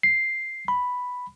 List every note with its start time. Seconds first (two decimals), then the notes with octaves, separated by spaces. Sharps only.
0.03 C7
0.68 B5